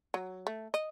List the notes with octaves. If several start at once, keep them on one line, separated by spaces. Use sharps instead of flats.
F#3
A3
D#5